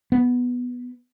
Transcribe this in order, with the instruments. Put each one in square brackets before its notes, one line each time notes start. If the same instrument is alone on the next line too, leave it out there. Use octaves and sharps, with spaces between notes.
[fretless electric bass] B3